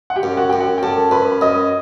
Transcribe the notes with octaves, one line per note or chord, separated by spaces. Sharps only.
F#5
G4 G5
F#2
F#4 F#5
F#2 G5
F#4 F#5
G5
F#2 A4 A5
F#2 B4 B5
F#2 D#5 D#6